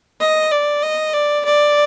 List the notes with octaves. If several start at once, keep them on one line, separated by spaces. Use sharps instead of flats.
D#5
D5
D#5
D5
D5